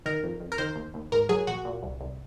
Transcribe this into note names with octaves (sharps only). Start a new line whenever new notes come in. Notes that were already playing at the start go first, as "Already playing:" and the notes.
D#3 A#4
F2
F2
A#4
D#3 C5
D#2
D#2
G#2 A#4
F#3 G#4
A#1 F#4
A#2
C2
C2